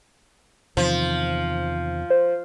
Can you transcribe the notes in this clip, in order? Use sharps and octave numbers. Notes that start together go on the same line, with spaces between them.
E2 C3 D#3 F3
C5